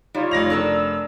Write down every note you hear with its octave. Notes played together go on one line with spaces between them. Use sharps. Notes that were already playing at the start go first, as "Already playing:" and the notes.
G3 D#4 F4 C#5
F1 A#6 F7
D4 A4 A#4 E6